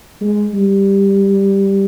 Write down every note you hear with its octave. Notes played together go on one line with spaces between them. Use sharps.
G#3
G3